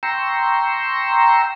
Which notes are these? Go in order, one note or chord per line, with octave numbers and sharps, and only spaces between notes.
G5 A#5 C6 C#6 E6